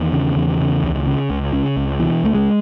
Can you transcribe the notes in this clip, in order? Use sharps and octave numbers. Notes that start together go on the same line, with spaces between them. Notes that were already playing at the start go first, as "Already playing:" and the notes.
Already playing: E2 D#3
C#3
E2
C#3
C#2
C#3
C#2
C#3
C#2
B2 E3
C#2 A3
G#3